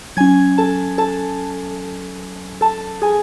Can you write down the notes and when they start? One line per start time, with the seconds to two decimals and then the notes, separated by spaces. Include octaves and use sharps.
0.17 F#3 C#4 G#5 G#6
0.58 A4 A5
0.98 A4 A5
2.61 A4 A5
3.02 G#4 G#5